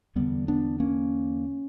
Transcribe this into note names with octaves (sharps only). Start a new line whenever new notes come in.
E2 D3 G3 B3
B3 D4
A#3 C#4